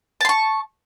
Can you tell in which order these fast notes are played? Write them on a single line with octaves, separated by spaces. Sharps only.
A5 C6 C#6